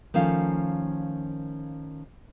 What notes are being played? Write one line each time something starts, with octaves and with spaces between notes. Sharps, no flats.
D#3 F3 A3 C#4 F5